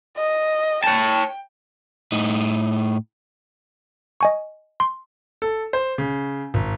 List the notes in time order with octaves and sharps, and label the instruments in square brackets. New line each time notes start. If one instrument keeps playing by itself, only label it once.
[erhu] D#5
[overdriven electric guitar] C#5 A5 [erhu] G5
[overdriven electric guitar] A2 D#4
[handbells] D#5 G#5 C#6
C6
[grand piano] A4
C5
C#3
G#1